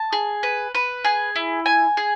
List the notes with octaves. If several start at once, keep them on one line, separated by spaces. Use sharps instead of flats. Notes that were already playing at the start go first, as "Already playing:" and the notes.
Already playing: A5
G#4
B4
B4
G#4
E4
G#5
G#4